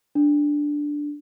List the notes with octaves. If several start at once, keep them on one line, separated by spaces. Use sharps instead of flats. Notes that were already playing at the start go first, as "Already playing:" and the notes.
D4